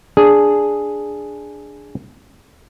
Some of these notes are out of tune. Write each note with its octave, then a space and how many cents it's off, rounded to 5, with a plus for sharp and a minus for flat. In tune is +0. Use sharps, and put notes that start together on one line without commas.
D4 +0 G#4 +0